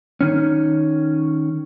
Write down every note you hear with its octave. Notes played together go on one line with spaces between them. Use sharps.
D#3 C#4